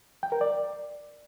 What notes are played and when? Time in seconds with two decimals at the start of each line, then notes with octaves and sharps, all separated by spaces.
0.23 G5
0.32 A#4
0.41 D5